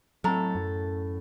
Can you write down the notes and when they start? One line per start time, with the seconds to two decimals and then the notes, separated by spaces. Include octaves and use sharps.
0.24 A2 F#3 C4 A4 A#5
0.55 F#2